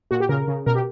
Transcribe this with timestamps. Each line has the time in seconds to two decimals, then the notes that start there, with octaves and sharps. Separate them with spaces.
0.11 A#2 F#4
0.20 G4
0.29 C#3 A#4
0.48 C#3
0.66 B2 A#4
0.75 G4